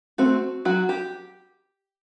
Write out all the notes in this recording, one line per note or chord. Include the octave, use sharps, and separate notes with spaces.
A3 C4 F#4
F#3 F#4
G4